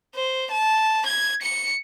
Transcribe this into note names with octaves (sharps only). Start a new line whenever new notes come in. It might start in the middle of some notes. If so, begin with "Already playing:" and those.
C5
A5
G#6
C#7